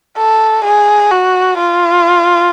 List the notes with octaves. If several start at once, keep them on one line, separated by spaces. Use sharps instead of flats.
A4
G#4
F#4
F4